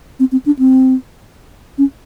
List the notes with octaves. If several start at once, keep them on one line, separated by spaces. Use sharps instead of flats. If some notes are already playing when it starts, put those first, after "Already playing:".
C4
C4
D4
C4
C#4